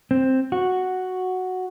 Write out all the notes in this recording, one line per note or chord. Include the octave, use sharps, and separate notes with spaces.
C4
F#4